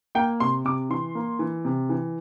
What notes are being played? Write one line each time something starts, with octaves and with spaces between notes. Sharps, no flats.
A#3 G5
C3 C6
C3 D6
E3 C6
A#3
E3
C3
E3